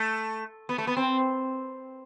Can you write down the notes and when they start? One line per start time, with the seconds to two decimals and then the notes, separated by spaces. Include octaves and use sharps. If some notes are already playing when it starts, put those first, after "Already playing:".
Already playing: A3
0.69 B3
0.78 A3
0.87 B3
0.97 C4